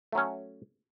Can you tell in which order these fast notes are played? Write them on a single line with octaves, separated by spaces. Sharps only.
A3 F#3 C#4